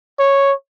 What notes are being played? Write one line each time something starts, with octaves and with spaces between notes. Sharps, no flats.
C#5